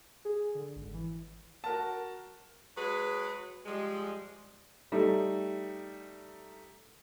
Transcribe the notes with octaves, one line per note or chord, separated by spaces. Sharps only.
G#4
D3
G#1
E3
F#4 A#4 A5
F#3 G#3 G#4 B4
F3 G3 G#3
G3 A3 D#4